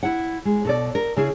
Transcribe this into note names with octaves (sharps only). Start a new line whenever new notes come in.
E4 F#5
G#3
B2 A4 D5
A#4
C#3 E4 G#4